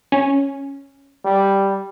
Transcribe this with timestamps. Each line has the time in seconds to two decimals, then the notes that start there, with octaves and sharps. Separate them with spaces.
0.12 C#4
1.25 G3